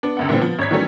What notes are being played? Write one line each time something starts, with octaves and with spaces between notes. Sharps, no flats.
B3 D4
C#2 F#2 F#5
A#2 D3 E3 G3 B3 C4
F3 B3
G#1 C#5 G#6 B6
D#3 E3 F#3 G3 A3 C#4